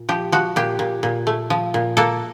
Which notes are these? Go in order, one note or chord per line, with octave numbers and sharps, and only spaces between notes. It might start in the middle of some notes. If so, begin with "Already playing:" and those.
Already playing: A#2
F3 G4
F3 F#4
A#2 G4
A#2
A#2
A3
F3
A#2
A#3 A4